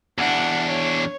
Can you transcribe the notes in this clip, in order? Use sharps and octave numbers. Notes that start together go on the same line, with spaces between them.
E2 D4 F#5
C#5